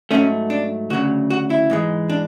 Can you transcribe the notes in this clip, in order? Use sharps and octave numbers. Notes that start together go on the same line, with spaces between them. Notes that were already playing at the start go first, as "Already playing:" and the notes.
G#2 F#3 A3 C#4
D4
D2 C#3 F#3 F#4
F#4
E4
G#2 E3 G#3
D4